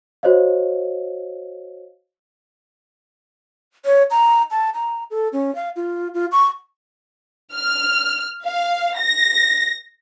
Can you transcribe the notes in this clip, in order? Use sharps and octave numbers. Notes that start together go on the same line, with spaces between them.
F#4 C5 C#5 D#5 F5
C#5
A#5
A5
A#5
A4
C#4
F5
F4
F4
C#6
F6
F5
A#6